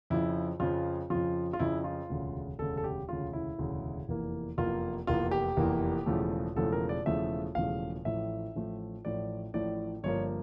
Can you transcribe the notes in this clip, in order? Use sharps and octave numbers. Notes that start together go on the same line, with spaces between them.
F2 C#3 F3 E4
F2 C#3 F3 F4
F2 C#3 F3 F4
F4
F2 C#3 F3 E4
F4
E1 D2 C#3
E1 D2 C#3 A4
A4
G4
E1 D2 C#3 F4
E4
E1 D2 C#3
F1 E2 E3 A#3
F1 E2 E3 A#3 F4
F1 E2 E3 A#3 F4
G4
F1 E2 E3 A#3
E1 E2 C#3 F3 A3
E1 E2 C#3 F3 A3 A4
A#4
D5
E1 E2 C#3 F3 A3 E5
E1 E2 C#3 F3 A3 F5
A1 A2 F3 A3 E5
A1 A2 F3 A3
A1 A2 F3 A3 D5
A1 A2 F3 A3 D5
G1 G2 F3 A#3 C#5